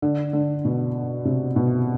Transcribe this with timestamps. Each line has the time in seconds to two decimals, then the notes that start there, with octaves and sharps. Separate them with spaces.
0.02 D3
0.33 D3
0.65 B2
1.25 C3
1.56 B2